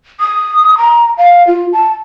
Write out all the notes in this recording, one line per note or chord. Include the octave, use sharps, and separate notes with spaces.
D#6
A#5
F5
F4
A5